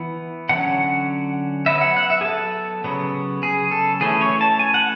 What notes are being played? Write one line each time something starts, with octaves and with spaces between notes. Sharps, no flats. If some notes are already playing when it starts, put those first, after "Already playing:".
Already playing: E3 B3
D3 F#3 C#4 F#5
F#3 B3 E5
F#5
F#5
E5
G#4
A4
C#3 F#3 B3
G#4
A4
E3 A3 C#4 G#4
C#5
A5
G#5
F#5